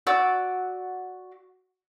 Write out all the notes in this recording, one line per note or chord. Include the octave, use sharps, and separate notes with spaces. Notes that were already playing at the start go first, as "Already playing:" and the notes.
F#4 D5 E6